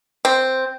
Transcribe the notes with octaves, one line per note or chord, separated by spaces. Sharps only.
C4